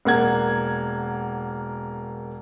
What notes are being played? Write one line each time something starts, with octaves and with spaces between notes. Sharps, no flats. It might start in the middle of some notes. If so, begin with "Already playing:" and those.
E1 A#3 F#5 G#6